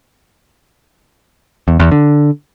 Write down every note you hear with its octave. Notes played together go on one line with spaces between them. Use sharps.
E2
E2
D3